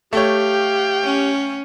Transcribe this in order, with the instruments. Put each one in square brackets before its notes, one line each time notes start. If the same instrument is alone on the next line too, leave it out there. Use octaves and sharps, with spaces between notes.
[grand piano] A3 C#5 [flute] G4 [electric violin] F5 G5
[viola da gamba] C#4